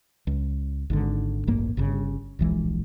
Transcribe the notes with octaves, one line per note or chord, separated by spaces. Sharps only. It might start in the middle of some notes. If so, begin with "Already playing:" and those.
C#2
G#1 G#2 D3
D#1 A1 G2 A#3
G1 G2 C#3
D1 A#1 E3 G#3